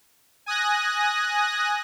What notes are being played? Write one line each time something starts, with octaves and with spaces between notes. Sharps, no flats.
G#5 D#6 F#6 A#6